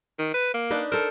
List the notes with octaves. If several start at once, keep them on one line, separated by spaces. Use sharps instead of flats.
D#3
B4
A#3
D4 D#4 B4
A4 A#4 C5